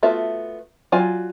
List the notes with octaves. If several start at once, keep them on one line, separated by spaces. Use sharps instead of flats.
A3 B3 F4 F#4 E5
F#3 F4 D5 G#5